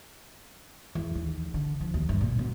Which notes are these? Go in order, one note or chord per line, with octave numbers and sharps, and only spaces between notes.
E2
D#2
D3
F3
D#2
G2
A#2
B2